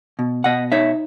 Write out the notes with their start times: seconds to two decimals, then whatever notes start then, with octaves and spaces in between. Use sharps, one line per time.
0.19 B2
0.44 B2 D#5 F#5
0.72 D#4 C#5 E5